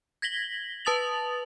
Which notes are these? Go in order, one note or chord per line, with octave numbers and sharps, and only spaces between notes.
G#6 A#6 B6 F#7 G7
B4 A5 D#6 A6 F7 F#7